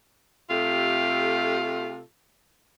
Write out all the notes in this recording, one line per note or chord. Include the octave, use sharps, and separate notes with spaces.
C3 A3 F4 G4 A4